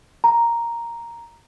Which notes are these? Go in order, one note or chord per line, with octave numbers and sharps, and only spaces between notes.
A#5